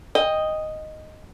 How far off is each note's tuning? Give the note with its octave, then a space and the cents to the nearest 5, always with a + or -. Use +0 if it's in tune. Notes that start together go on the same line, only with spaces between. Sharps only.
D#5 +0 G5 +20